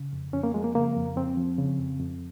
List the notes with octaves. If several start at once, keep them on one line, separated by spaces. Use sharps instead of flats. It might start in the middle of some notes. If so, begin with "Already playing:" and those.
Already playing: C#3
F2
F2 C#4
A#3
F3 G#3
A#3
C#3 A#3
F2
F2 C4
F3
C#3
F2
F2